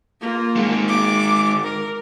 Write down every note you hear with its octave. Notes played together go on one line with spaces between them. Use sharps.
A#3 F4
D#3 G#3
D6
A#4